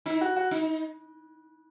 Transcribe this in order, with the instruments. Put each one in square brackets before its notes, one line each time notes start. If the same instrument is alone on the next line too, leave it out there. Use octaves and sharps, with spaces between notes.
[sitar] D#4 [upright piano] E4
[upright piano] F#4
F#4
[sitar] D#4